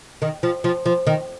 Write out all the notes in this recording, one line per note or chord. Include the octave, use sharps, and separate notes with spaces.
D#3
F3
F3
F3
D#3